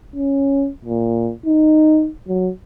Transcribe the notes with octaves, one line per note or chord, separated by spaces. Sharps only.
C#4
A#2
D#4
F#3